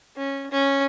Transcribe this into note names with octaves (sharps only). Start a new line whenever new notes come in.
C#4
C#4